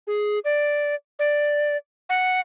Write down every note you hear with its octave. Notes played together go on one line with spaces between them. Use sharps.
G#4
D5
D5
F#5